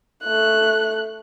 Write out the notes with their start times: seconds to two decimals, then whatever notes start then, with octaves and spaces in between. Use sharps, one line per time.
0.23 A3 F#6